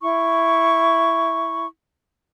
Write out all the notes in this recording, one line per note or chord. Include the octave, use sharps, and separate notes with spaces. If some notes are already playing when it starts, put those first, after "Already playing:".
E4 C#6